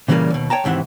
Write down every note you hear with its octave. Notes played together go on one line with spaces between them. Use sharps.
A#2 C#3 E3 F3 G3 A#3
D#2 B2
C#5 G5 A5 A#5
D#2 G#2 C3 E3 F#5